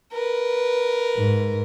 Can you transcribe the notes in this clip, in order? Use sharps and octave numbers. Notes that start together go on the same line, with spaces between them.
A#4 B4
G#2